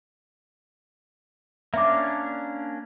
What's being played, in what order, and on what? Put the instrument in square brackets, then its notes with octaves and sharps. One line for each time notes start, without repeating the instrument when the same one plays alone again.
[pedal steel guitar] A#3 C#4 D4 [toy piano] E5 D6